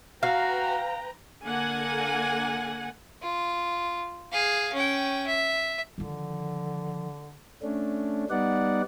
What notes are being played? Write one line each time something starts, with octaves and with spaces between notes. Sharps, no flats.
F#4 B4 F5 G5 A#5
D3 A#3 F#5 G#5
F4
G#4 F5
C#4 G5
E5
D3 D#3 F3
A3 C#4 D4
G3 B3 D#4 D5 F#5